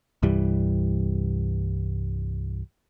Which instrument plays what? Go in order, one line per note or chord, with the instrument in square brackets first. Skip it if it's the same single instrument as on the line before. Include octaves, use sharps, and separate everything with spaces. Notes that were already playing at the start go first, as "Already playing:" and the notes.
[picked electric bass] C2 G2 E3 G3